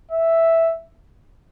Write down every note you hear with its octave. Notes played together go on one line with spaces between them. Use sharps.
E5